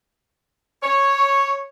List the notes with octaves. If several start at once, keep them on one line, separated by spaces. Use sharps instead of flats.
C#5